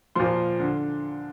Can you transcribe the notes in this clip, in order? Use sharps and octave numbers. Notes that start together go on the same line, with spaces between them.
A#2 F3 C6
D3